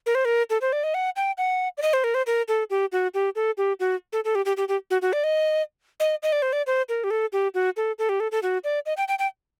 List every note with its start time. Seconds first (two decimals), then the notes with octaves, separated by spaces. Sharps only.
0.06 A#4
0.15 C5
0.25 A#4
0.50 A4
0.61 C5
0.73 D5
0.84 D#5
0.94 F#5
1.16 G5
1.38 F#5
1.78 D5
1.82 D#5
1.93 C5
2.04 A#4
2.14 C5
2.27 A#4
2.48 A4
2.70 G4
2.92 F#4
3.14 G4
3.36 A4
3.58 G4
3.80 F#4
4.13 A4
4.25 A4
4.35 G4
4.46 G4
4.57 G4
4.68 G4
4.90 F#4
5.02 F#4
5.13 D5
5.24 D#5
6.00 D#5
6.23 D#5
6.32 D5
6.42 C5
6.53 D5
6.67 C5
6.89 A#4
7.04 G4
7.11 A4
7.33 G4
7.54 F#4
7.77 A4
7.99 A4
8.09 G4
8.20 A4
8.32 A4
8.43 F#4
8.64 D5
8.86 D#5
8.97 G5
9.08 G5
9.19 G5